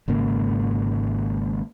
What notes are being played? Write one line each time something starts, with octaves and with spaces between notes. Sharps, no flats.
G#1 G#2 C#3 A#3